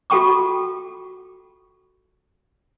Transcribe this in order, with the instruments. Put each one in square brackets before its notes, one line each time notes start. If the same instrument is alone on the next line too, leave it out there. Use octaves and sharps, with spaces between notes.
[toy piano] F4 F#4 A4 G5 C#6 D6